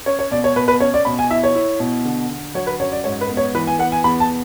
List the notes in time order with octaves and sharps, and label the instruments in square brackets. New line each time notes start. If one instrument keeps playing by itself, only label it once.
[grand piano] C#4 C#5
C#5
B2 D5
C#5
B2 B4
B4
C#4 C#5
D5
B2 B5
G#5
E4 E5
C#5
E4
B2
D3
D3
F#3 C#5
B4
F#2 C#5
D5
G#2 C#5
B4
B3
C#5
E3 B4
G#5
B3 F#5
G#5
E2 B5
A5